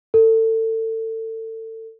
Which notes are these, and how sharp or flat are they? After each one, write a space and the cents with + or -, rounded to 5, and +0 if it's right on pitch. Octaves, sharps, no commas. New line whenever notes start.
A4 +30